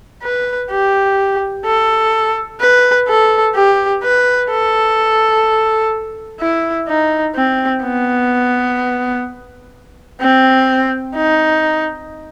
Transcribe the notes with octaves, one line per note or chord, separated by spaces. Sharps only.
B4
G4
A4
B4
A4
G4
B4
A4
E4
D#4
C4
B3
C4
D#4